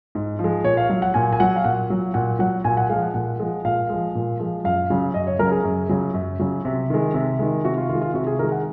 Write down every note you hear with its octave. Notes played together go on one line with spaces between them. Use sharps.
G#2
F3
G#3
A#2 C#5
F5
F#3 F5
F#5
A#2 G#5
G#5
F#3 F#5
F5
A#2 F#5
F#3
A#2 F#5
F#3 F#5
A#2 G#5
F#5
F3 G#3 F5
F#5
A#2 F#5
F3 G#3
A#2 F5
F3 G#3
A#2
F3 G#3
F#2 F5
C#3 F#3
F#2 D#5
C#5
C#3 F#3 A#4
G#4
F#2
C#3 F#3
F#2
C#3 F#3
C3
D#3 G#3
C3
D#3 G#3
C3 F#4
F4
D#3 F4
G#3
F4
C3 F#4
G#4
D#3 G#3 A#4
F#5